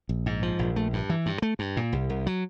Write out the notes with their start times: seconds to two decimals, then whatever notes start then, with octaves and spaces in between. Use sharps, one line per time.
0.09 A#1
0.26 G#2
0.43 F3
0.59 A#1
0.76 A3
0.93 G2
1.10 E3
1.26 G2
1.42 A3
1.59 G2
1.77 A#2
1.93 C2
2.10 C2
2.26 F#3